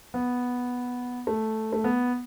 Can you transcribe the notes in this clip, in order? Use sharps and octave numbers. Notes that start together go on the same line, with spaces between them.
B3
A3
A3
B3